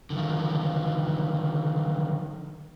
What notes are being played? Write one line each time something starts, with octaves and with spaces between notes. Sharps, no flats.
D3 D#3 F3